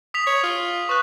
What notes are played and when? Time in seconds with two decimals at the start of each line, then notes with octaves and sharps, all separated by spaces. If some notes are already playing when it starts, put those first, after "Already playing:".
0.14 D#6 B6 F7
0.27 C#5
0.43 F4
0.89 B4 C#6 F#6